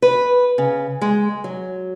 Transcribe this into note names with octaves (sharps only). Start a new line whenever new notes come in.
B4
C#3
G#3
F#3